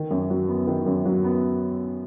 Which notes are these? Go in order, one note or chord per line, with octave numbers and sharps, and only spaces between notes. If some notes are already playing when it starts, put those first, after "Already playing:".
Already playing: D#3
F#2
F#3
B3
D#3
F#2
F#3
B3